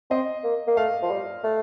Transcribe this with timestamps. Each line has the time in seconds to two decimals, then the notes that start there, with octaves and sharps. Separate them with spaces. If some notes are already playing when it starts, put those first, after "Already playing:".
0.10 C4 D#5
0.44 A#3
0.67 A#3
0.77 A3 F5
1.02 F3
1.11 G3
1.44 A3